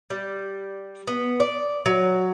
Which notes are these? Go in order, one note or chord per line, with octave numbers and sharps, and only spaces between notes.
G3
B3
D5
F#3